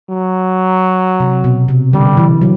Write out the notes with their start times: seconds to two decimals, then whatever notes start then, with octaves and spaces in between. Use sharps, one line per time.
0.09 F#3
1.20 C3
1.44 B2
1.68 C3
1.93 D3 G3
2.17 E3
2.41 F#3